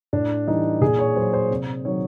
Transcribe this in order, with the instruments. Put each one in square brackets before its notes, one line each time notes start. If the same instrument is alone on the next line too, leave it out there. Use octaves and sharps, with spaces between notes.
[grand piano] A2 D4
E3 G3 D#4
A#2 G#4
C#5
F#3 C5
C5
C3
D#3 F#3 C#5